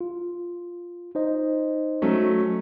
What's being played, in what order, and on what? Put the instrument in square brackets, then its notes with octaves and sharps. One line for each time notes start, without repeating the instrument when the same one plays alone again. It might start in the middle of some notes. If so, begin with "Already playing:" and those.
[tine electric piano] F4
D#4 C5 D#5
[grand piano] F#3 A3 C#4